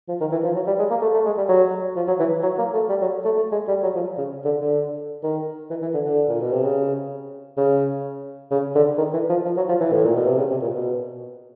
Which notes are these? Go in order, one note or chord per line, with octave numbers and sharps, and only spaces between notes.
F3
D#3
E3
F3
F#3
G3
G#3
A#3
A3
A3
G#3
G3
F#3
F3
F#3
E3
F#3
A#3
A3
G3
F#3
A3
A3
G#3
G3
F#3
F3
C#3
D3
D3
D#3
E3
E3
D3
D3
A#2
B2
C3
C#3
C#3
C#3
D3
D#3
E3
F3
F3
F#3
F3
E3
A2
A#2
B2
C3
C#3
C3
A#2
B2